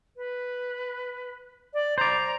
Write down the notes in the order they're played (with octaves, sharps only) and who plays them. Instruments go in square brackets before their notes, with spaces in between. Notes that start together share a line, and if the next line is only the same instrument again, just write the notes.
[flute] B4
D5
[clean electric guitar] C5 D5 [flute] A#5